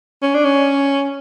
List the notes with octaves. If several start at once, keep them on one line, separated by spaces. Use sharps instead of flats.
C#4
D4
C#4